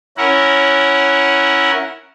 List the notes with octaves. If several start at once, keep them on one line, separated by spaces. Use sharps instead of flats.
C#4 E4 A#4 F#5